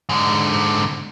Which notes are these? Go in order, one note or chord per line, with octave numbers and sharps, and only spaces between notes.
G#2 D3